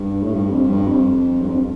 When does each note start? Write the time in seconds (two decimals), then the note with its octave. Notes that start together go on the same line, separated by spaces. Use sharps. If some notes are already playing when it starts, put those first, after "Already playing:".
Already playing: G2
0.22 A2
0.34 G2
0.51 F2
0.70 G2
0.88 F2
1.41 G2
1.48 F2